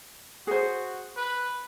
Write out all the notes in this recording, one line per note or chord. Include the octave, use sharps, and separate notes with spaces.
F#4 G#4 C5
B4